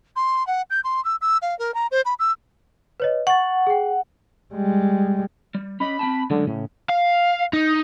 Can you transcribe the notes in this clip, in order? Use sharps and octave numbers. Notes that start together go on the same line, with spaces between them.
C6
F#5
G6
C6
E6
E6
F5
A#4
A#5
C5
B5
E6
B4 C#5 D#5
F#5 C#6 A6
G#4 G5
G3 G#3
G3
C#4 D#5 B5
C4 G5 A5
F#2 D3 G#3 A3
A2 C#3
F5
D#4